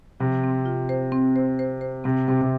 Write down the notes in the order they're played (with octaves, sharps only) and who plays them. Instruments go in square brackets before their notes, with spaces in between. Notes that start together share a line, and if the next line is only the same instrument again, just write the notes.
[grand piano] C3 [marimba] F3
[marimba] C4
F4
C5
C4
C5
C5
C5
[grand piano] C3 [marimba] C4
[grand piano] C3 [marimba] C4
[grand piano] C3